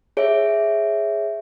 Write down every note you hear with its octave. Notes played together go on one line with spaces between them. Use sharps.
G#4 C#5 E5